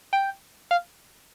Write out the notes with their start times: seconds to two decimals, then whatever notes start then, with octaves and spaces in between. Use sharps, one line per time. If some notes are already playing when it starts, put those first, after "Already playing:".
0.13 G5
0.71 F5